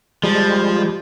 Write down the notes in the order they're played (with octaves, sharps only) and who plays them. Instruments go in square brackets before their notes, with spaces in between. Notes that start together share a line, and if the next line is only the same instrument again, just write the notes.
[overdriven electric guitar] F3 [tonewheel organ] G3 G#3